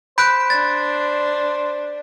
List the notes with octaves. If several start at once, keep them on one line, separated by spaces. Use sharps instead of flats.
C5 B5 F#6 G6 B6 D7
D4 A6